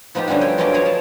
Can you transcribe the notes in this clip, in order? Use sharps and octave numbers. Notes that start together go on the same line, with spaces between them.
F3 B3 D#4 F4 G4
D3 F3 G3 C#4 F#4
C#5 G5 C6
F3 F#3 G#3 B3 A#4 D5
G#4 A#4 C#5 A#5
A5